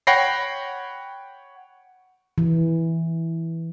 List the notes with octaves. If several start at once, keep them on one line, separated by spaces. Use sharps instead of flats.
C#5 F#5 G5 B5 A#6 C7
E3